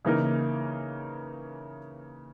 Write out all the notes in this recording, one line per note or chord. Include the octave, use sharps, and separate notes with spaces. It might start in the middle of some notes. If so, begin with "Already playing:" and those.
C#3 E3 A#3 D#4 A#4